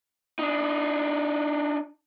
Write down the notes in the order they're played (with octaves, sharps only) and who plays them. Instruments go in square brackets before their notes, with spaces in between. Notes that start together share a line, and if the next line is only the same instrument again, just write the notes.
[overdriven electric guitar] D4 D#4